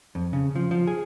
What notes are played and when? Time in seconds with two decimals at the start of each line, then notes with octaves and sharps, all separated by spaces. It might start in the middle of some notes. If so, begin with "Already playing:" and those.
0.15 F2
0.33 C#3
0.56 F3
0.71 F3
0.87 G#4